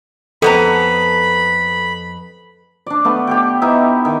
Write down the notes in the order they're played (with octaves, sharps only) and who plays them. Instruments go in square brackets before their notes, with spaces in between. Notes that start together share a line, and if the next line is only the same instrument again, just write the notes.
[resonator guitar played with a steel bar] F2 B3 A#5 [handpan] A4 [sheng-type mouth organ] B5
[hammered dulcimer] D4 D5
A3 B3 D4
G4 A4 G5
B3 D#4 E4 E5
D#3